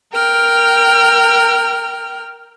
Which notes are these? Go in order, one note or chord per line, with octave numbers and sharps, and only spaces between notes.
A#4 G5 F6